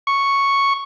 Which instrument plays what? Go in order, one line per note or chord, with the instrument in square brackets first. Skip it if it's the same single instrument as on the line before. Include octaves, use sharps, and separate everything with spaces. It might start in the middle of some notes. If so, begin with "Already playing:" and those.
[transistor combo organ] C#6